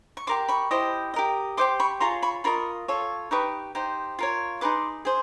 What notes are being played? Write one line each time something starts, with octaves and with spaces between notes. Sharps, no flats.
C#6
G4 A#4 D5 C6 D6
B5 C#6
E4 G4 C5 D#5
G4 A#4 D#5
G4 C5 D#5 C6 D6
B5 C#6
F4 G#4 C#5 A#5 C6
B5 C#6
F4 A#4 D#5 B5 C#6
F4 A4 C#5
D#4 G4 B4 C#6 D#6
D#4 G4 C5
F4 A#4 C#5
D#4 G#4 B4 C6 D6
G#4 C5